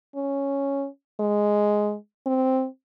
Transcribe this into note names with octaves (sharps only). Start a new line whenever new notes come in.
C#4
G#3
C4